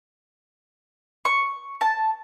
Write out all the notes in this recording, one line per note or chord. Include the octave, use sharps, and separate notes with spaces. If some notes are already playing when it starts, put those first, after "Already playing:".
C#6
A5